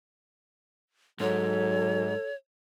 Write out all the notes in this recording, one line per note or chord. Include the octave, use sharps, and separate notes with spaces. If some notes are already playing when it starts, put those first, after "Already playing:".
G#2 F#3 A4 C#5